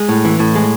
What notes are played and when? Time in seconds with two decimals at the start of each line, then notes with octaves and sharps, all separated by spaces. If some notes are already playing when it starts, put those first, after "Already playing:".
Already playing: G#3
0.09 A2
0.25 E3
0.39 A2
0.55 G#3